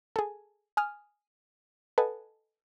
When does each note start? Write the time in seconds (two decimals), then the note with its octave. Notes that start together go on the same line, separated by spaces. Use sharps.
0.16 G#4 A4
0.77 G#5 D#6 F6
1.98 A4 B4 D#5 F#5 G#5 A5